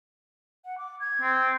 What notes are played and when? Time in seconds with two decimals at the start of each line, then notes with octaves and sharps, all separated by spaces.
0.65 F#5
0.78 D6
1.00 G#6
1.22 C4